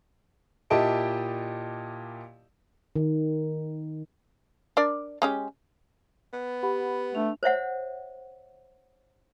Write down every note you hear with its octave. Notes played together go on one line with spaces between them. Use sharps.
A#2 E4 G4 D#5 A5 D7
D#3
D4 A#4 D5
G#3 C#4 G4
B3
G4 F#5 B5
A3 D4 F7
C5 C#5 E5 F#5